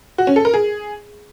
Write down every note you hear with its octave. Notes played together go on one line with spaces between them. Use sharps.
F#4
C#4
A4
A#4
G#4